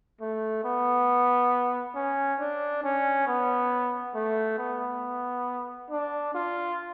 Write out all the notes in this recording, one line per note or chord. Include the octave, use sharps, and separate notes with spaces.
A3
B3
C#4
D4
C#4
B3
A3
B3
D4
F4